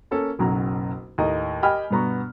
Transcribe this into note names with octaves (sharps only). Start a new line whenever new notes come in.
A#3 C#4 A4
F#1 B1 C#3 F#3 A#5
D#2 A2 D#5 A#5
G4 D#5 G5 G#5 B5 F6
G2 B2 B3 A#5 C#6